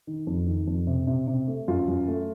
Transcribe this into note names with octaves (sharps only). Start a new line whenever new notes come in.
D#3
F2
D#3
F2
C3
C3
C3
A3
F#2 F4
F#2
A3